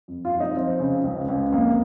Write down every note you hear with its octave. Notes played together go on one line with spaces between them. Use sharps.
F2
F4
F2
D#4
F3 C4
C#3
C#2
C#2
F2 A#3